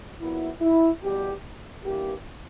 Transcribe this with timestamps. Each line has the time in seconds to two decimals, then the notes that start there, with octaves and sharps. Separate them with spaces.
0.20 A#2 F#3 B3 E4
0.61 E4
1.02 E2 B2 G3 G4
1.84 G2 E3 A#3 G4